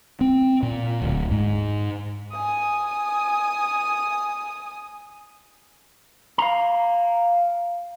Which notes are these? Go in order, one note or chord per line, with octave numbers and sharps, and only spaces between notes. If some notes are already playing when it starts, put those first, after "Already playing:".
C4
A#2
D1
G#2
G#5 D#6
F5 A#5